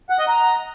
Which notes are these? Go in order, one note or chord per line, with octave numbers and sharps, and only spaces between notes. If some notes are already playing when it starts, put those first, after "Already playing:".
F#5
D#5
A#5